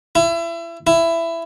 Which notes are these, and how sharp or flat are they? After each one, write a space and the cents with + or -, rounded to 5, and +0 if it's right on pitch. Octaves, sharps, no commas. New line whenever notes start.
E4 +30
E4 +15